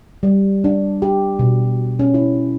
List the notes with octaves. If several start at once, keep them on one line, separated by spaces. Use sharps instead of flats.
G3
D4
G4
B2
C#4
E4